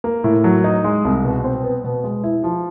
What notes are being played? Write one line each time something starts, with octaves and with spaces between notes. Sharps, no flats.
A#3
A2
F#3
D#4
G#3
C2
B2
C4
B3
B2
G#3
E4
F3